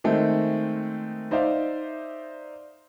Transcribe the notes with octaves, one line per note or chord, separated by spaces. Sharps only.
D#3 G#3 A3 C4
D#4 C5 D5 E5 F5